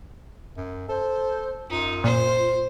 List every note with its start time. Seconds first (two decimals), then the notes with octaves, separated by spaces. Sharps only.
0.57 F#2
0.89 A4 C5
1.70 F#2 D#4 F4
2.04 A#2 C5